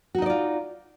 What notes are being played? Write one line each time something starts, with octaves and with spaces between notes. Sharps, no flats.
D#4 F4 F#4 D5 D#5